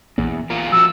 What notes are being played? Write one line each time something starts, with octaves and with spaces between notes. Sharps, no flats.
A#1 E2
E2 F4 A#4
F3 F#4 A#4 E6